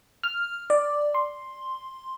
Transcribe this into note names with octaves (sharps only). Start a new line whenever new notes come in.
F6
D5
C6